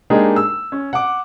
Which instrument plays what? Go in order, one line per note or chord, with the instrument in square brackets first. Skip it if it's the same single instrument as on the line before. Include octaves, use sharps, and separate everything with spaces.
[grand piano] G#3 A#3 D4 D#4 G4 G#4
E6
C#4
F#5 D6